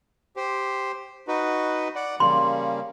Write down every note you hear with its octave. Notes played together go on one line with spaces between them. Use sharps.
G4 C5
D#4 F#4 B4
D5 F#5
C#3 G3 A#3 C6